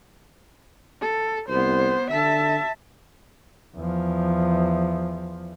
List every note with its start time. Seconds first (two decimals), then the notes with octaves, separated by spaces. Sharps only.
1.01 A4
1.49 C2 B3 C5
2.11 D3 E5 A5
3.77 E2 F3